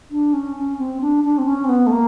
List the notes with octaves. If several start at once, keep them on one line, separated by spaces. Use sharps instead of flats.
D4
C#4
C#4
C4
D4
D4
C4
C#4
C4
B3
A3
A#3